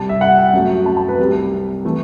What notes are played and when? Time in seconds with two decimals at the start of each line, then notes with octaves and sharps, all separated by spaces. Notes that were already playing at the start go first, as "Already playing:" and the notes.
Already playing: C2 C3 G3 A5
0.09 E5
0.21 F#5
0.38 G5
0.53 F#2 F#3 A3
0.86 A5
0.97 A5
1.08 B4
1.19 C2 C3 G3
1.85 E3 A3